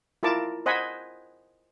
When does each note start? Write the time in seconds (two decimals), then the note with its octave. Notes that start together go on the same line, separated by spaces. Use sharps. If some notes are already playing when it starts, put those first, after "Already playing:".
0.23 E4 F4 A#4 A5 D6
0.66 C5 D#5 F#5 G#5 B5